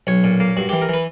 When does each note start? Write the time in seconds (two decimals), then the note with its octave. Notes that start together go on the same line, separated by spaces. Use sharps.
0.07 B1 C#5
0.24 A#2
0.40 A#3
0.57 G2 F#4
0.69 E3 G4
0.82 A#4
0.89 E3 B4